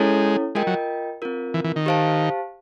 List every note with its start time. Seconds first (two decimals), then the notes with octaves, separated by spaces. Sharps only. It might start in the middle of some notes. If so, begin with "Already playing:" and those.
Already playing: G#3 C#4 E4 A4 C#5
0.55 G#3 F4 A#4 D#5 G5
0.67 F#3
1.22 C4 F4 A#4
1.54 E3
1.64 E3
1.76 D#3
1.86 G4 C5 F5 A5